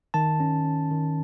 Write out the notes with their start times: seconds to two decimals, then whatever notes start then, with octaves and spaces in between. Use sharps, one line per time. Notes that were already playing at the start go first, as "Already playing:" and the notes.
0.14 D#3 A5
0.40 C#4
0.65 C#4
0.91 D#3